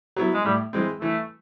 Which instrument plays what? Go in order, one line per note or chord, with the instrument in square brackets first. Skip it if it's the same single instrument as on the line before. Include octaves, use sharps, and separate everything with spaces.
[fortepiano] F#3 B3 E4
[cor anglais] G#3
[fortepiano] A2 [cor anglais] G3
[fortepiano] E3 G#3 C4
[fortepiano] E3 [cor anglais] A3